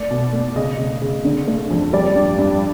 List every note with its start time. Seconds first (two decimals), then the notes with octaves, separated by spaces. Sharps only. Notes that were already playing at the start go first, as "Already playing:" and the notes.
Already playing: A3 D5
0.11 B2
0.33 A3
0.56 C#3 D#5
0.78 C#3
1.02 C#3
1.25 D3
1.47 A3
1.71 F2
1.93 G3 D5
2.15 G2
2.39 G2